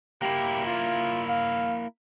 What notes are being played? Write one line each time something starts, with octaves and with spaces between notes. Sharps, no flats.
A#3 E4 G4
F4
F5